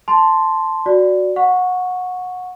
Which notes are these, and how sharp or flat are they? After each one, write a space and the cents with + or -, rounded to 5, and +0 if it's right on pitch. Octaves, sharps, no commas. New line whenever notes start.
A5 +0 C6 +0
F#4 -5 D5 -5
F#5 -25 C#6 +0